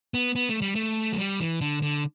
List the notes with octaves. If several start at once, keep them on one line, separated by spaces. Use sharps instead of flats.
B3
B3
A3
G3
A3
F#3
G3
E3
D3
D3